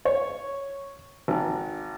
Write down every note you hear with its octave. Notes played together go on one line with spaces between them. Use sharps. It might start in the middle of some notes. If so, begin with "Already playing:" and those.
C#5
G#1